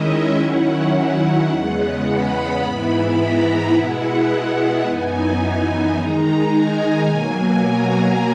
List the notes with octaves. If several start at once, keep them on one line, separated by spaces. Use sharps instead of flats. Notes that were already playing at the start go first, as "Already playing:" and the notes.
Already playing: D#3 G#3 C#4 E4 D#5 E5
D#3 F#3 C#4 E4 F#5
E2 C#3 G#3 B3
B5
G#2 E3 B3 E4 B5
A#5
B2 G#3 B3 E4 F#5
F#5
F#2 E3 B3 D#4 G#5
G#5
D#3 G#3 D#4 A#5
G#5
B2 F#3 A#3 G#5
A#5